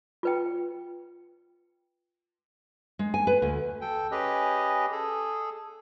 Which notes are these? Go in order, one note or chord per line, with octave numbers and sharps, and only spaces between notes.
F4 B4 G5
G#3
G#5
B4
D2
A4 G5
C#4 G4 G#4 B4 D#5
G#4 A4